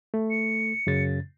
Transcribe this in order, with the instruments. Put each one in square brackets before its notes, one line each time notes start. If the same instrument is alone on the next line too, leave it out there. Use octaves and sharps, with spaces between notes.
[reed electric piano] A3
[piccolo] C#7
[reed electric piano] F#2 C#3 A6